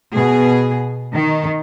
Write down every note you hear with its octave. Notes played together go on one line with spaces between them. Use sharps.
B2 G#4
D#3